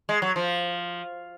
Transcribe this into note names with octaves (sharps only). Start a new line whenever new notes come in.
G#3
F#3
F3